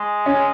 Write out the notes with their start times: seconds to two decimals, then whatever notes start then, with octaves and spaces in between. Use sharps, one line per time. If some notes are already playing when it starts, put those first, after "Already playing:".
Already playing: G#3
0.26 C#4